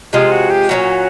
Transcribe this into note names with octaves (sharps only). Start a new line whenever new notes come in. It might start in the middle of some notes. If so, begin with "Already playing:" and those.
C3 F3 G#3 F4
F#4
G4
A#2 F#3 A3 C#4 F#4